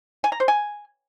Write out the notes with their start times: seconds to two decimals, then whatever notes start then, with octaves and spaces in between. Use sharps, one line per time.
0.24 G#5
0.32 A#5
0.40 C5
0.48 G#5